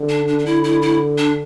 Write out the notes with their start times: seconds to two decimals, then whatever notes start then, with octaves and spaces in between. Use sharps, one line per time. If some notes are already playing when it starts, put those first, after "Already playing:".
Already playing: D3
0.09 D4
0.28 D4
0.39 D4
0.45 D3 E4
0.64 E4
0.82 E4
1.18 D4